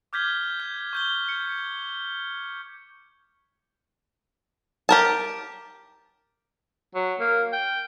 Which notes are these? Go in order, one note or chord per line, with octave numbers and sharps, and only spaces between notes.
D6 F6 G6 G#6 B6 G7
G6
C#6 G6 G7
C#7
G4 A#4 A5
F#3
A#3
G5